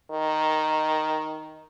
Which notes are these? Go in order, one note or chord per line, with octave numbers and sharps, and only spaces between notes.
D#3